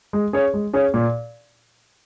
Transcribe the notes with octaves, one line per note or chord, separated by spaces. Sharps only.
G#3
C#4 G#4 C#5
G#3
C#4 G#4 C#5
A#2